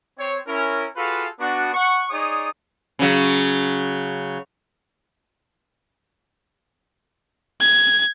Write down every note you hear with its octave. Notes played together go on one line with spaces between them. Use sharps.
C4 C#5
C#4 E4 A#4
F4 F#4 G#4 A4 B4 F5
B3 D4 F#4
F#5 C#6
D#4 G#4 C#5 D5 D#6
C#3 F#3
G#6